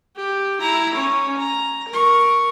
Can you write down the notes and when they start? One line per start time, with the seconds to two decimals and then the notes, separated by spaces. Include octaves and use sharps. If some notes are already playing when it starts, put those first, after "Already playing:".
0.17 G4
0.61 E4 A#5
0.95 C#4 C#5
1.38 A#5
1.89 A#4 C#6